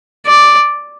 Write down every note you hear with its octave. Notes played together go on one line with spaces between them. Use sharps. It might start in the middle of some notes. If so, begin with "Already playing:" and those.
D5